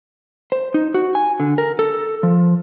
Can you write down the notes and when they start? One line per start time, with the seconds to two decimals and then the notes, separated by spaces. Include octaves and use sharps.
0.52 C5
0.74 D#4
0.94 F#4
1.15 G#5
1.40 D3
1.58 A#4
1.79 A4
2.23 F3